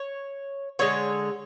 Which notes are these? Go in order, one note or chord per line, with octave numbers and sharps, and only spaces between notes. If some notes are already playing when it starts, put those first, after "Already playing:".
Already playing: C#5
D3 G#3 C#5